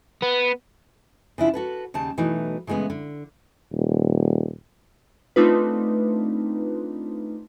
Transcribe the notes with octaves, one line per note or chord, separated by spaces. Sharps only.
B3
C#3 D4 E4 F4
F#4 A4 B4
D#2 C#3 G3 A5
B2 E3 F#3 A3 D#4
C#3 E3 G#3 A3 B3
D3
D#1
A3 C4 D4 D#4 F4 B4